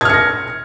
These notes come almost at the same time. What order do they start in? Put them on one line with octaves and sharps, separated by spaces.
G#6 F6 C#7 A#6